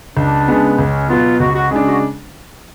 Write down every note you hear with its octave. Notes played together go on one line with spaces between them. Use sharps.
C#2 D4
C#3 G#3 B3
C#2 C#4
B2 F#3 B3 F4
C#2 F#4
F#4
C#3 G#3 D4
F#4